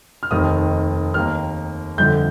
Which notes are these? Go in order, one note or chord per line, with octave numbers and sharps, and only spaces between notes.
F6
F1 D#2 D#3 D#6
D#2 D#3 A#3 F6
G1 F2 D3 G6